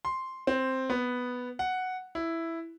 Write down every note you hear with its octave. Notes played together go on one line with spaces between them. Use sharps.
C6
C4
B3
F#5
E4